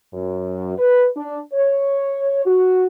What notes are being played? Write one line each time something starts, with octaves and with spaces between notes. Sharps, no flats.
F#2
B4
D4
C#5
F#4